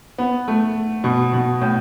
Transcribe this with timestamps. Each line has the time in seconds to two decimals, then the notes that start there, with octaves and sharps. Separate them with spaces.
0.18 B3
0.48 A3
1.04 B2
1.33 B2
1.61 A2